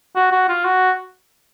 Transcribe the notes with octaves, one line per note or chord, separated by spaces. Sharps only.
F#4
F#4
F4
F#4